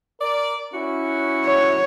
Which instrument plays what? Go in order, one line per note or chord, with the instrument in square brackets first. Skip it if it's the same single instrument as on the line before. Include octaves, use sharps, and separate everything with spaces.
[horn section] A#4 D5
C#4 E4 F#4
[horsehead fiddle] C#5